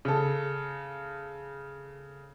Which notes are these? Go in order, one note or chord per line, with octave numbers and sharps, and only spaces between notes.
C#3 A4